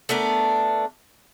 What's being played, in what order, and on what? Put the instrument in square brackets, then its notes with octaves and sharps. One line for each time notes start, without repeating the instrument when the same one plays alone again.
[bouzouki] A3 B3 D4 A#4